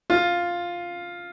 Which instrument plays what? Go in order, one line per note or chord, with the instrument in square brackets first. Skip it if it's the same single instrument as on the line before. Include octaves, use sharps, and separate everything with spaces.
[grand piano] F4